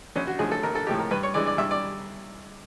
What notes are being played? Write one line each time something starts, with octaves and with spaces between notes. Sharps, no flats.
A#1 C#4
F#4
A2 F3 G#3 G#4
A4
A#1 A#4
A4
A2 F3 G#3 G4
A#4
G2 B4
C#5
E3 G#3 D5
D5
G2 E5
D5